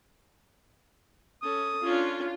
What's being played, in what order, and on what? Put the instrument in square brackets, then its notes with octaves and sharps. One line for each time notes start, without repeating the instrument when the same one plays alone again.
[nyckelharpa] C#4 A4 [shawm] D#6
[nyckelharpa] C#4 D4 [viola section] F4